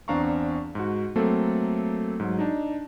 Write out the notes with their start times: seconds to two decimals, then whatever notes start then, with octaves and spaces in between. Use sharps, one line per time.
0.08 E2 C4 D4 F5 A#5 C#6
0.75 G#2 F#4
1.16 F#3 A3 A#3 C4 A4
2.20 G#2 F#3
2.39 D4 D#4